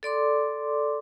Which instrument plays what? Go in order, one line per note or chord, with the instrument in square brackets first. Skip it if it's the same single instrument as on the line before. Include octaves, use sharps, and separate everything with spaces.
[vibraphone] A4 D5 C6 D6